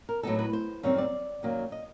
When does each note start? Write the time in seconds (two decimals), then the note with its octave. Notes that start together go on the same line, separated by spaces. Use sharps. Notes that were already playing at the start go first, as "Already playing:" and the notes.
0.09 A#4
0.23 A2 F#3 B3 D#4 A4
0.39 B4
0.53 C5
0.83 F#2 D#3 G3 C4 C#5
0.98 D5
1.43 F#2 D#3 F#3 A#3
1.72 D#5